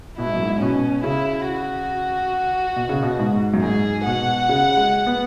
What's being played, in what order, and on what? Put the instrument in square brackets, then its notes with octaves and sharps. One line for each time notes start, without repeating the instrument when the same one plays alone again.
[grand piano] B2 [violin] E4
[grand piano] G#2
F#2
G#2
[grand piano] B2 [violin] C#4
[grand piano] C#3 [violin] E4
[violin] F#4
[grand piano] B2
C#3
B2
G#2
F#2
[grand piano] G#2 [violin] G#4
[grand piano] B2 [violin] F#5
[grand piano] C#3
G#3
B3